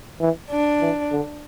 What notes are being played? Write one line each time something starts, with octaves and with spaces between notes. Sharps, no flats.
E3
D4
E3
D3